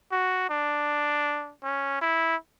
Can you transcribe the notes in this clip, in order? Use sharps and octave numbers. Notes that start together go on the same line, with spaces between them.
F#4
D4
C#4
E4